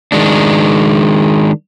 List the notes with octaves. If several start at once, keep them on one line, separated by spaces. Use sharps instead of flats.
D#3 G#3 D4